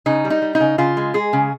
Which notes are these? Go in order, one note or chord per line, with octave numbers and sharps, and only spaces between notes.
C#3 D#4
G3
D#4
G3
D#4
C#3
C#3 F4
G#3
G#3 G#4
C#3